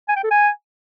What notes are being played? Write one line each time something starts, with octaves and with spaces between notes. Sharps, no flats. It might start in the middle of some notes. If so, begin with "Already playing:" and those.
G#5
G5
A4
G#5